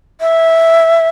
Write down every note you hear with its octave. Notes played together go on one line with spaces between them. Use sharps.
E5